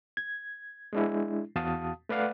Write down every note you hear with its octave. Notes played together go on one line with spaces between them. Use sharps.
G#6
G#3 D4 E4
E2 F#4 F5 A5 D#6
A3 B4 D5 F5 F#5